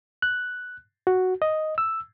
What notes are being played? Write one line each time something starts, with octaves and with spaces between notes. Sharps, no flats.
F#6
F#4
D#5
E6